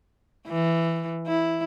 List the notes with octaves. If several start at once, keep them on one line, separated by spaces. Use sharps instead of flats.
E3
E4